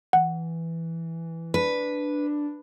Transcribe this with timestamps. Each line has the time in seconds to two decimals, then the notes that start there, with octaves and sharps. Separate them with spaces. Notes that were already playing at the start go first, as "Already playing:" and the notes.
0.13 E3 F#5
1.54 D4 B4